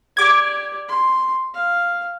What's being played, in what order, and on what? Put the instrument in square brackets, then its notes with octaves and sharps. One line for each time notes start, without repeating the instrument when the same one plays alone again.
[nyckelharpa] G4 D5 [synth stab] D6 G#6
[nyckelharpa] C6
F5